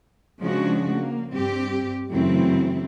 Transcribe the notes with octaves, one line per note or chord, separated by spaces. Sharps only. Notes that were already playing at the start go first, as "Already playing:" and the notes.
C#3 F3 G#3 D4 F#4
A#3
G2 C4 G4
F#2 C#3 E3 A3 C4 E4